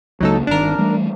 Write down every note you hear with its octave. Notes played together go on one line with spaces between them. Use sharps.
C#2 C#3 F#3 A#3 D#4 A4
G1 D#3 D4 A#4
E3 G3 A3